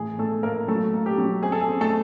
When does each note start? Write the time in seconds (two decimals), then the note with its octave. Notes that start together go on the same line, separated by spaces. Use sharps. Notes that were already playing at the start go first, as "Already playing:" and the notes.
Already playing: A2 E3 G#4
0.18 A2 A3 A4
0.43 A2 A#3 A#4
0.68 F#3 A3 A4
0.93 A#3
1.06 G4
1.18 F#3
1.43 C4 G#4
1.52 A4
1.61 G#4
1.68 C4
1.81 A3 A4